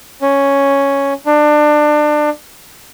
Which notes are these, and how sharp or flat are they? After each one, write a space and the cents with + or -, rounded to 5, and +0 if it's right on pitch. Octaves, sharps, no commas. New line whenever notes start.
C#4 +0
D4 +25